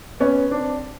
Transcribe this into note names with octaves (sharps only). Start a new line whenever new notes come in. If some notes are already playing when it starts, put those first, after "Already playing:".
B3 C#4
C4 D4